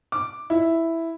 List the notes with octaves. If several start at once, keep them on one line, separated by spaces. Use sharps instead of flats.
D6
E4